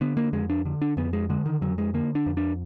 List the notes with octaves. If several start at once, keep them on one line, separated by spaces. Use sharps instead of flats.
D3 B3
A#3
F2 G#3
D4
D3
D4
F2 B3
G#3
D3 G#3
D#3
F2 F#3
G#3
D3 A#3
D4
F2
D4